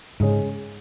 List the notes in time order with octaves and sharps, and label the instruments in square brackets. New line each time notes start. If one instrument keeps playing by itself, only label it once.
[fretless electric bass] G#2 [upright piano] C#3 G#3 C#4